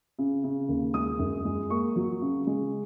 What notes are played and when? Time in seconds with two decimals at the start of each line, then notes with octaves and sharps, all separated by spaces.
0.19 C#3
0.44 C#3
0.69 D#2
0.94 G#3 D#6
1.19 F#2
1.45 G#3
1.70 A#3 C#6
1.96 F#3
2.22 C#3
2.47 G#3